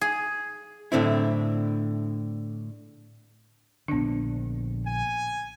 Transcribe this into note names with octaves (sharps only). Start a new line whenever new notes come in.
G#4
A2 D3 C4 E4
A#1 D3 B3 D4
G#5